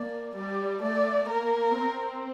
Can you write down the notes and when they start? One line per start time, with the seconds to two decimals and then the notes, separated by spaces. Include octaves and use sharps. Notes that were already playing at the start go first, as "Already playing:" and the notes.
Already playing: A#3 D5
0.36 G3 D5
0.83 A3 D5
1.29 A#3 A#4
1.76 C4